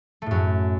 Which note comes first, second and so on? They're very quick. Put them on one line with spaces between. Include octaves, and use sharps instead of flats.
A3 A2 F#2 F#3